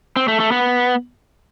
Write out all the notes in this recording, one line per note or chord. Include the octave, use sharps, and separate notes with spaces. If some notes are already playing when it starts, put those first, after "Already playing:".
C4
A3
A3
B3